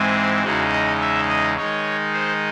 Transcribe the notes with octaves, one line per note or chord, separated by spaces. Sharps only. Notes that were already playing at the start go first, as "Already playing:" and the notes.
Already playing: G#2 E3 G#3 C4 G#4
E2 C#3 G#3 D#4 F#4
D#5
E5
D#5
D#3 G#3 D#4 C#5
C5